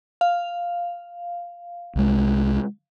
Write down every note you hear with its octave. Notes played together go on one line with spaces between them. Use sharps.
F5
C2 G#3